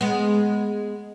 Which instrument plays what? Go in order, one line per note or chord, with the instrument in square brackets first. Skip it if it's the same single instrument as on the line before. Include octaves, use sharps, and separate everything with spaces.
[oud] G#3 B3